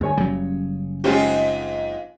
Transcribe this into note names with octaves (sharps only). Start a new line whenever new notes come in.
D2 G2 G#4 C#5 G#5
F#1 C#3 F#3 G3
G#2 G#3 C4 C#4 F4 G4